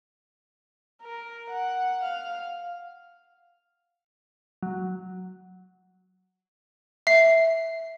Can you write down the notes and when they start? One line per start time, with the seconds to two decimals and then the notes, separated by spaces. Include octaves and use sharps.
1.02 A#4
1.50 F#5
2.03 F5
4.63 F#3
7.07 E5 C7